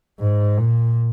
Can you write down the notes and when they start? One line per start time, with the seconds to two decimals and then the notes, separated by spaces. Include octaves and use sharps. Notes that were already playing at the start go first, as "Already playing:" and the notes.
0.20 G#2
0.58 A#2